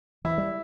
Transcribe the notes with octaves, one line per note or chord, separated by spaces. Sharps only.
E3 E4
G3